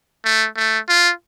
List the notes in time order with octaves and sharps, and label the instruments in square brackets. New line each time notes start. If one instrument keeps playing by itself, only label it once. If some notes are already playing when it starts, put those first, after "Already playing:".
[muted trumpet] A3
A3
F4